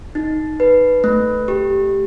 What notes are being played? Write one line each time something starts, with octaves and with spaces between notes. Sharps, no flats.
D#4
B4
A3
G4